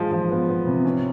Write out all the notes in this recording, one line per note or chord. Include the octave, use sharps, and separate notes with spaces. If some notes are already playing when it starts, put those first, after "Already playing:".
Already playing: F3 G#3
F3
B3
B3
C3
C#4